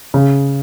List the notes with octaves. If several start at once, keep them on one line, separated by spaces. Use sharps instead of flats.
C#3